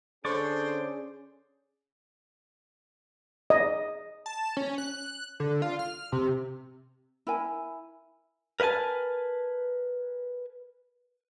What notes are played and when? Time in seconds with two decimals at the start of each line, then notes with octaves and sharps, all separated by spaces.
0.25 D3 C#4 G#4 C5 D5 C#6
3.50 D#5
4.26 A5
4.57 C#4
4.78 F#6
5.40 D3
5.62 F4
5.79 F6
6.12 C3
7.27 E4 A#4 G#5
8.60 A#4 B4 E5 G#5 A5